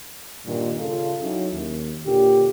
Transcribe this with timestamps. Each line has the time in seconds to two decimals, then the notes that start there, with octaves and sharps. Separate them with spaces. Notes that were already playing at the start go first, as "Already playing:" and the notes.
0.47 G2 A#2 D#3
0.81 C#3 F4 A4
1.22 F#3 C#4 D#4 E4 F#4
1.54 D#2
2.06 A#2 D3 C#4 G4